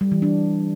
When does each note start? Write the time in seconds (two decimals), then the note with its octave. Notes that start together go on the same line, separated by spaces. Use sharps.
0.01 G3
0.12 E3
0.22 D4